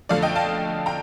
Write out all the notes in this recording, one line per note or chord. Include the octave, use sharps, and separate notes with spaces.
F2 D3 F3 A3 D5 F5
D#5 G5
F5 A5
G5 A#5